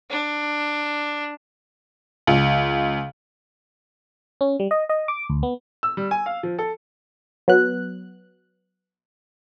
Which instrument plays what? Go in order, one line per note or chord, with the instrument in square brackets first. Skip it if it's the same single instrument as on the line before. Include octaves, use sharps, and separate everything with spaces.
[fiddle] D4
[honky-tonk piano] C#2
[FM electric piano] C#4
G3
D#5
D#5
D6
D2
B3
[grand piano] E6
G3
G#5
F5
F3
A4
[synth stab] F#3 B3 F#6